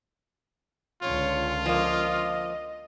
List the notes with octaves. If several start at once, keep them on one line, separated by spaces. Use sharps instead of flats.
C#2 D3 F4 C#5
F3 A#3 D#5